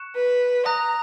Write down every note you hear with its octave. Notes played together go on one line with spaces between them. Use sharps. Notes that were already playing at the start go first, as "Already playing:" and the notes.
Already playing: C#6 F#6 C#7 E7
B4
A#5 D#6 F#6 A#6